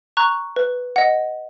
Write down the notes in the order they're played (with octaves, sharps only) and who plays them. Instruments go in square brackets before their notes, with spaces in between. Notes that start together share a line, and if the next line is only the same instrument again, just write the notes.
[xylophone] A#5 C#6 F#6
B4
D#5 F#5